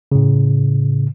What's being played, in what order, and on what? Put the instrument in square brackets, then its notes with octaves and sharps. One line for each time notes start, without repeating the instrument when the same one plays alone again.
[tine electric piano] A2 C#3